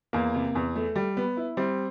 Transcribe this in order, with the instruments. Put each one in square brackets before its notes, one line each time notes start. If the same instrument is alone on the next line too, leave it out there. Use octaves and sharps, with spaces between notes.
[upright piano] E2 [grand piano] A#3
[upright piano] C3
E2
A3
G3
B3
E4
[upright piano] G3 [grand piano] C4